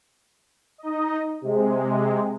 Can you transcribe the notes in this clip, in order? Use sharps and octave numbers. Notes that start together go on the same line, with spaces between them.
D#4 D#5
C3 G#3